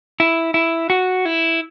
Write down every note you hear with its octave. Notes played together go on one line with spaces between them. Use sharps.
E4
E4
F#4
E4